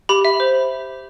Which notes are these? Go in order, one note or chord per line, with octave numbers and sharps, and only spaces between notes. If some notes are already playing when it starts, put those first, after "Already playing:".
G4 B5
E5
C5